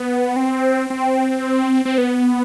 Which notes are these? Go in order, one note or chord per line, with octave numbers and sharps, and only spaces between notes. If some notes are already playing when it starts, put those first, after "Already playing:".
Already playing: B3
C4
C4
C4
B3